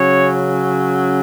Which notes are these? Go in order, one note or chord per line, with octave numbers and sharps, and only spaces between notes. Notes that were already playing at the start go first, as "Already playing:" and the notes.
Already playing: C#3 F#3 C#4 C#5